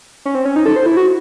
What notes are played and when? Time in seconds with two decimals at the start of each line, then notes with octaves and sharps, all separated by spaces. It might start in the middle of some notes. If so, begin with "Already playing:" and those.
0.25 C#4
0.35 C4
0.45 C#4
0.56 D#4
0.66 A4
0.76 C5
0.86 E4
0.97 F#4